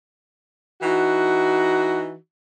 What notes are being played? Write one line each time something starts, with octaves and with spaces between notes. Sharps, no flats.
E3 D#4 F#4